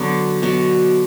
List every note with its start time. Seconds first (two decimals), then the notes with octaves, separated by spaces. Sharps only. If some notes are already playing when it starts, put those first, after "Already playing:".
Already playing: D3 F#3 B3
0.42 B2 F#3 B3 F#4